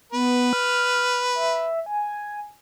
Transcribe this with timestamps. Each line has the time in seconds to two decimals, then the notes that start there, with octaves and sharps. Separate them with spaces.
0.12 B3 B4
0.53 F6
1.35 E5
1.86 G#5